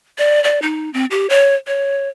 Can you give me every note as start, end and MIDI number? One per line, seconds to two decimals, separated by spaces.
0.18 0.42 74
0.44 0.62 74
0.62 0.92 63
0.93 1.06 60
1.11 1.27 67
1.30 1.55 73
1.67 2.09 73